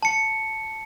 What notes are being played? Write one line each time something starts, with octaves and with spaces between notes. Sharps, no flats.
A5 C#7